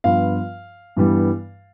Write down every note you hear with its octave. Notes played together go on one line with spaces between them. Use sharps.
G2 F3 B3 F4 F5
G2 E3 G3 B3